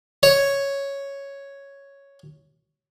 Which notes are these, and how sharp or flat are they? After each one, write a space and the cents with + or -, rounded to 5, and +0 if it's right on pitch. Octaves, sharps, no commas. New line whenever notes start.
C#5 +0